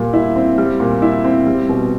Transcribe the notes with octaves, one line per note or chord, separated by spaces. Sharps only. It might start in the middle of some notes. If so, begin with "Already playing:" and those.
Already playing: A#2 G3
E4
C4
G3
A#2
E4
C4
G3
B2